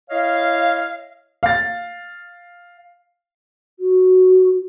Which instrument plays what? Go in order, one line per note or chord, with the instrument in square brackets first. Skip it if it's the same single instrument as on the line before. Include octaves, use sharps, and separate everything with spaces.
[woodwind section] E4 C#5 D#5 F5
[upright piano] F5 A6
[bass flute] F#4